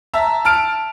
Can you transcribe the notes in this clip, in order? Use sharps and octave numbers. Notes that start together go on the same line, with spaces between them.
E5 A5 A#5 E6
A5 F6 D7